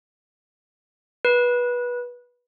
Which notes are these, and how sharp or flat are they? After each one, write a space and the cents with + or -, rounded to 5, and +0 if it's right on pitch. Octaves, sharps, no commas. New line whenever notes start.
B4 -20